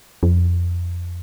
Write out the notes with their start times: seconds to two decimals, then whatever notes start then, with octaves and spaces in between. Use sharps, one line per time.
0.23 F2